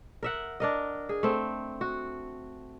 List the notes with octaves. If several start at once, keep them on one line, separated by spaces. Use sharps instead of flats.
A#4 E5 F#5
D4 A#4 D#5
G#4
A3 C4
F#4